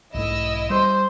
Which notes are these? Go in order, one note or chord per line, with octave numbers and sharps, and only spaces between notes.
B1 G#2 A3 E4 D#5 E6
G3 C5